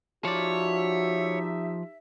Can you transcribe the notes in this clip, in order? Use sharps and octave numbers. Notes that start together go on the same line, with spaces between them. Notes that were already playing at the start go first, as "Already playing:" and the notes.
F3 D#4 F#4 G4 C#5 D5 E5